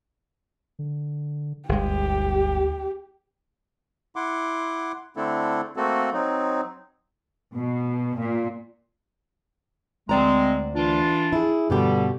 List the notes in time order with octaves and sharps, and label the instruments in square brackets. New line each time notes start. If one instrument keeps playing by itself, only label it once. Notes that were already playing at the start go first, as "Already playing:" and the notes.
[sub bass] D3
[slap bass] G1 G#3 [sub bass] D2 [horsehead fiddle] G4
[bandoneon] E4 F#5 C6 D6
D3 A3 C4 D4 E4 A4
A3 A#3 C4 F#4 A4
F#3 C4 D#4
[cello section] B2
A#2
[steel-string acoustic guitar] D2 D5 A#5 [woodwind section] G#3 C4
[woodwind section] E3 D4 F4
[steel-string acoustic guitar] E4 G#4
[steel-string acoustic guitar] G2 B2 G4 [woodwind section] D3 G3